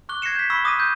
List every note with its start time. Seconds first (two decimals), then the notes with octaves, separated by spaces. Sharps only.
0.09 C#6 D6 F#6 G7
0.22 G#6 A#6 C7 C#7 E7
0.35 G6 B6
0.50 B5 C#6 E6 B6 G7
0.64 D6 D#6 F#6 A#6 B6 D#7
0.78 E6 G6